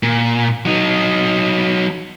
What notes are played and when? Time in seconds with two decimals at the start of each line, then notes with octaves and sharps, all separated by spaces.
0.03 A#2
0.65 F#3 D#4